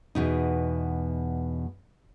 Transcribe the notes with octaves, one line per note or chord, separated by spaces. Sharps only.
E2 B2 D#4